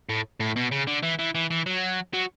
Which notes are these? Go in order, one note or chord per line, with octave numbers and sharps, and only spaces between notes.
A2
A2
B2
C#3
D3
E3
E3
E3
E3
F#3
F#3